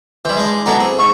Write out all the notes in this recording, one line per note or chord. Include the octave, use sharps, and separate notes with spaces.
E3 G3 E4 C5
G#3 D4
F#3 B3 D4 E4 A4 A#5
C4 G#4
G#2 C#6